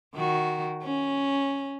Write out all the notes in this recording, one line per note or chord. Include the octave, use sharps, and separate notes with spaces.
D#3 F#4
C#4